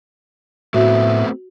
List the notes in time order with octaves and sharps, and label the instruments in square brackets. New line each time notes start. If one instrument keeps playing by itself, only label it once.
[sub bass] A2 [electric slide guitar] A3 B3 C4 [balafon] F#4 [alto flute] E5